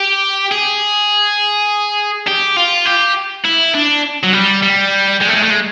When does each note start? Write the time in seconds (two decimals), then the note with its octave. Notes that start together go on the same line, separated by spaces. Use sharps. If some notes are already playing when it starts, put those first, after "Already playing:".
Already playing: G4
0.51 G#4
2.27 G4
2.57 F4
2.86 G4
3.45 E4
3.74 D4
4.23 F#3
4.33 G3
4.63 G3
5.21 G#3
5.28 A3
5.35 G#3
5.43 A3
5.50 G#3